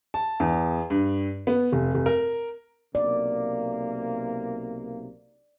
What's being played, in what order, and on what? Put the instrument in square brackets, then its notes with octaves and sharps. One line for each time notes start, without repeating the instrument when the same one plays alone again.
[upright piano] A5
E2
G2
B3
F1
F1
A#4
[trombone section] B1 C3 A#3 [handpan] D5